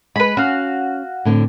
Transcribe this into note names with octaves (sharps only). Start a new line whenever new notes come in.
G#3 B4 B5
C#4 F#4 F5
A2 D3 C4